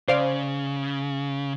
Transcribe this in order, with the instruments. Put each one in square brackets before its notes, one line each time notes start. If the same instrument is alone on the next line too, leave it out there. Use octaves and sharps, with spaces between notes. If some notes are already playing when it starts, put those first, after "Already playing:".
[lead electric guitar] C#3 [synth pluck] C5 D5 F5